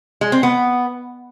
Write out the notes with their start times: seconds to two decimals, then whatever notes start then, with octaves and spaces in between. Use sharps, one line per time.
0.21 G#3
0.32 C4
0.43 B3